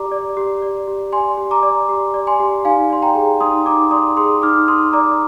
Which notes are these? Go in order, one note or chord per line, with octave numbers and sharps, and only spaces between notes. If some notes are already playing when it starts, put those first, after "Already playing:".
Already playing: G4 D5 A#5 D6
D5
G4
D5
G4
D5 G#5 C6
G4
A#5 D6
D5
G4
D5
G#5 C6
G4
D#4 F5 G#5
D5 C6
G5 A#5
G#4
D#4 C6 D#6
D#4 A#5 D6
D5 C6 D#6
G#4 C6 D#6
D#4 D6 F6
D#4 C6 D#6
D5 A#5 D6